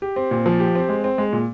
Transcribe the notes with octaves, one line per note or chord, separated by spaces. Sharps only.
G4
C4
A#2
F3
G4
C4
G#3
C4
G#3
A#2